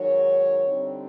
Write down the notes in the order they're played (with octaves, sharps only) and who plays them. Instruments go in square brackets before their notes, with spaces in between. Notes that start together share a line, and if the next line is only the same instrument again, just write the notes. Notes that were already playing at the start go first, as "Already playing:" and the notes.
Already playing: [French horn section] G#2 D#3 F#3 C#5
D3 G3 C4 D#4